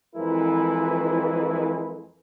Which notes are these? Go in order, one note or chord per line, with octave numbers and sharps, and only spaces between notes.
F2 E3 F3 G#3 E4 A#4